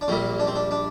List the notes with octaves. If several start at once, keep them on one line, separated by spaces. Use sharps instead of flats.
D4
A#1 A#2 G3 A#3 C4
D4
C4
D4
D4